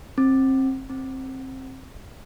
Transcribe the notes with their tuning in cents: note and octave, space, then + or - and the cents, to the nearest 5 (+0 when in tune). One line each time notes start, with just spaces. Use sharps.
C4 +25
C4 +15